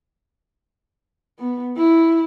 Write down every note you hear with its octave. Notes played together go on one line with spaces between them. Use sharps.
B3
E4